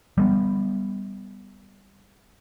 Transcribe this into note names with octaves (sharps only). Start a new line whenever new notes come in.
G3 G#3 B3